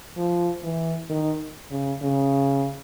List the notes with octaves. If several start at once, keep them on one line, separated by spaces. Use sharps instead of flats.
F3
E3
D#3
C#3
C#3